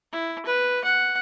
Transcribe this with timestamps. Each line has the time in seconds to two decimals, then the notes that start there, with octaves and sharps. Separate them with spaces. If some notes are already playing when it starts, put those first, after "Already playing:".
0.12 E4
0.46 B4
0.84 F#5